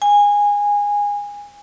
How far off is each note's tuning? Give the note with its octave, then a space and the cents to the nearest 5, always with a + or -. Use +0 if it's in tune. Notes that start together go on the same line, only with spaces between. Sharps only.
G#5 -20